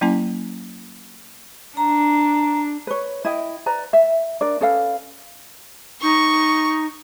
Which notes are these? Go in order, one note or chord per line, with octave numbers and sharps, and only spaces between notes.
F#3 A#3 C#4 E4 G#5
D4 A#5
B4 C#5
E4 D#5 G5
B4 D5 A#5
E5
D4 A#4 D5
C#4 A4 B4 F5
D#4 C#6